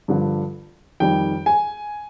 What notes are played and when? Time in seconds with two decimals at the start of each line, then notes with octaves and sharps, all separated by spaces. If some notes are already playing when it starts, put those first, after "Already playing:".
0.08 G2 D3 F3
1.00 F2 D#3 G3 G5
1.46 G#5